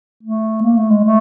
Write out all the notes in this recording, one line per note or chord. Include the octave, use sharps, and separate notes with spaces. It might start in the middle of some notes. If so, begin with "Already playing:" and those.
A3
A#3
A3
G#3
A3